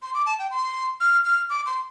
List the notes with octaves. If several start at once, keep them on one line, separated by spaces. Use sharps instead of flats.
C6
D6
A5
G5
C6
F6
F6
D6
C6